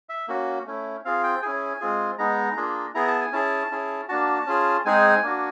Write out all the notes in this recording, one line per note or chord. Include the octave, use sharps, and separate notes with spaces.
E5
A#3 C#4 F#4
A3 C#4 E4
C4 F4 G#4 F5
G5
C#4 E4 G#4 G#5
G#3 C4 F4 G#4
G#3 B3 D#4 A#5
A#3 D4 F4 G#4
B3 E4 G#4 A#5
A5
G#5
C#4 E4 G#4 A5
C#4 E4 G#4
A#3 D4 F#4 A5
C#4 F4 G#4
G#3 C4 D#4 G#4 G#5
A#3 D4 F#4